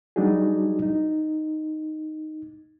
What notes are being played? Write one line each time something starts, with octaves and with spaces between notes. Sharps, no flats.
F#3 G3 D4 D#4 F#4 G#4
D#4